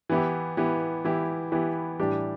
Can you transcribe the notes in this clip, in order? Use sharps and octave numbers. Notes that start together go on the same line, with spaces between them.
E3 B3 E4 G4
E3 B3 E4 G4
E3 B3 E4 G4
E3 B3 E4 G4
A2 E3 G3 D4 G4